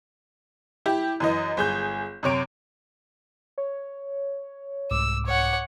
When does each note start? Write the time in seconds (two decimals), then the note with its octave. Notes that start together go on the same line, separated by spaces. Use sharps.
0.86 E4 G4
1.20 F#2 E3 D#5
1.57 G1 G#4 G6
2.23 F#2 C3 C#5 D7
3.58 C#5
4.91 C2 G#2 D6 E6
5.26 C#5 F#5